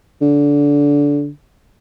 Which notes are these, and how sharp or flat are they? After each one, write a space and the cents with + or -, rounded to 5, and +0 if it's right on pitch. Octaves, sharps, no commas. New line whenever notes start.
D3 -20